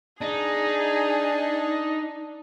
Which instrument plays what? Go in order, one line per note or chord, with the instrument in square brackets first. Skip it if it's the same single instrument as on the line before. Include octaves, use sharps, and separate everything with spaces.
[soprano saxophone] D4 [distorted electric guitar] D#4 [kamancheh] G#4